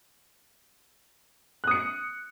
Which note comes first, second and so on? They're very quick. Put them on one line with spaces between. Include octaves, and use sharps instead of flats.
F#6 D#6 C#7